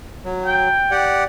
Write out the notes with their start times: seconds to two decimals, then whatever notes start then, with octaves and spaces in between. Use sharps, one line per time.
0.25 F#3
0.45 G5
0.91 G4 D5 F#5